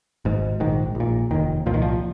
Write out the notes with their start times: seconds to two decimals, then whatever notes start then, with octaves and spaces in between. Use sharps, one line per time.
0.25 G#1 G#2
0.60 A#1 G#2 D#3
0.95 A#1
1.00 A#2
1.31 F1 D#2 D#3
1.66 C2 A#2 F3
1.74 D#3
1.82 F3